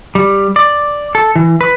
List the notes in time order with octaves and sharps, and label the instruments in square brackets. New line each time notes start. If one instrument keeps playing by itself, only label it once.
[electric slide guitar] G3
D5
A4
E3
B4